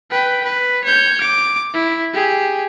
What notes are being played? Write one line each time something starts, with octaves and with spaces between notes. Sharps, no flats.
B4 G5
B4
C#5 G6
D6
E4
G4 G#4